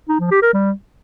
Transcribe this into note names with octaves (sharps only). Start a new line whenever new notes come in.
D#4
F3
G4
A#4
G3